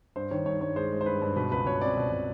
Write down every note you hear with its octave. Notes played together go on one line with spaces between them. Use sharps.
G2 C5
D#3 C#5
G2 C#5
G2 C#5
G#3 C5
G#3
C5
G2 B4
G2
B2 B4
C#2 B4
B2 C#5
C4 D5
B2
B2